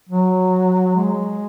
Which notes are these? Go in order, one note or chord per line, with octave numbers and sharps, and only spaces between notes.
F#3
G#3